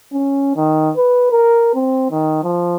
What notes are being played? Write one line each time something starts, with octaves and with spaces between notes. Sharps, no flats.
C#4
D#3
B4
A#4
C4
D#3
F3